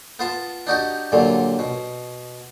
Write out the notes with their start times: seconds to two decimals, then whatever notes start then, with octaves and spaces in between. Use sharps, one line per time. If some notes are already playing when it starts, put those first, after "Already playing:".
0.19 B3 F4 A5
0.67 D4 D#4 F#4 G4
1.12 G2 A#2 D3 F#3
1.59 B2